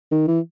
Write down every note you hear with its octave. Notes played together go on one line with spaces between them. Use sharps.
D#3
E3